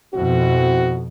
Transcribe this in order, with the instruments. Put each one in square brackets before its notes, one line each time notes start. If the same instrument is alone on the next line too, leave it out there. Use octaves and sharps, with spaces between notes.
[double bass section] F2 B2 [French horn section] C4 E4 F#4